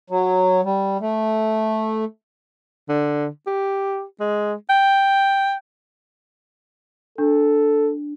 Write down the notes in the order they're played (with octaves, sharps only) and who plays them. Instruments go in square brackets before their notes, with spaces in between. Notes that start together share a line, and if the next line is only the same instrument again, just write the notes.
[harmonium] F#3
G3
A3
[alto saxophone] D3
G4
G#3
G5
[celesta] D4 [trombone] A4